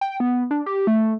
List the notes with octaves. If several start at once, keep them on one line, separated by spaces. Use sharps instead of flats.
G5
B3
D4
G4
A3